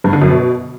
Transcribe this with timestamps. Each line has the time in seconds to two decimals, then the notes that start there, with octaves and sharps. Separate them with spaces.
0.04 G2
0.13 D3
0.22 F#2
0.30 B2